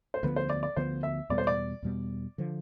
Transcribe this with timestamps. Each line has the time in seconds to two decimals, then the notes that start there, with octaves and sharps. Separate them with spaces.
0.14 C5
0.23 D2 D3 F3 B3 B4
0.36 C5
0.50 D5
0.63 D5
0.76 D2 D3 F3 B3 C5
1.03 E5
1.29 E2 B2 G3 B3 D5
1.38 C5
1.47 D5
1.82 E2 B2 G3 B3
2.38 D3 F3